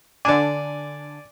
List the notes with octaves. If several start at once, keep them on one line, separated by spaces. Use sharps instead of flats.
D3 D4 D5 G#5